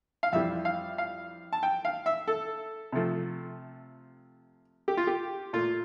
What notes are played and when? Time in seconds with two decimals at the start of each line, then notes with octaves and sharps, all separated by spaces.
0.23 F5
0.33 F2 E3 G3 E5
0.65 F5
0.98 F5
1.53 A5
1.63 G5
1.85 F5
2.06 E5
2.28 A4
2.92 C3 F3 A3
4.88 G4
4.97 F4
5.07 G4
5.53 A#2 A3 F4